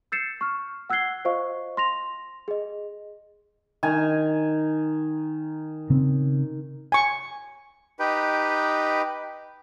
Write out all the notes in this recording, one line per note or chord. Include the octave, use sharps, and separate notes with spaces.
E6 G6 A6 C7 C#7 E7
C#6 F6
F#5 E6 F#6 G#6 C7 G7
F4 C5 D#5 F5 C#6
C6 A#6 F7
G#4 D#5
D#3 G#5 A#5
C#3 C4
G#5 C#6
D#4 G4 B4 G5